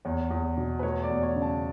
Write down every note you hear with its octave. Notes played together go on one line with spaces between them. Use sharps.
E2 C#5
E2
B2
B4
A3 C#5
D5
E2
C#5
C#3
A5